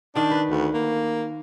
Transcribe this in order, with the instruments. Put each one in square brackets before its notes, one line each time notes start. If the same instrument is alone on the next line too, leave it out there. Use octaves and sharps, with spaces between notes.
[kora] D#3 G5 [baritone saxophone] D4
[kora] B4
[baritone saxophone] D2
A#3